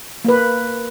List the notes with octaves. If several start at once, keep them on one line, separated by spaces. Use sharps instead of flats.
A#3 B4